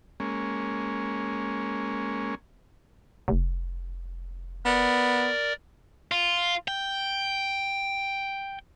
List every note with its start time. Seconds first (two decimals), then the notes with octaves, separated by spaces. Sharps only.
0.20 G#3 A#3 C#4
3.28 F1
4.65 B3 A#4 D5
6.12 F4
6.68 G5